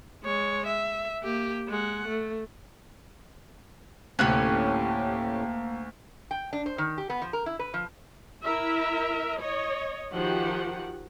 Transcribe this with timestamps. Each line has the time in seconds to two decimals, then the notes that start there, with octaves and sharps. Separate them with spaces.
0.24 G#3 C#5
0.66 E5
1.23 A#3 G4
1.68 G#3 F#5
2.08 A3
4.19 D2 A2 C3 A#3 C#4 G4 F#6 F#7
6.31 G5
6.53 D4
6.66 C5
6.78 D#3
6.98 G4
7.10 B3
7.22 F3
7.33 A#4
7.46 E4
7.59 B4
7.74 F3
8.45 E4 A#4 E5
9.39 C#5 D#5
10.13 D#3 F3 F#4 G4 F#5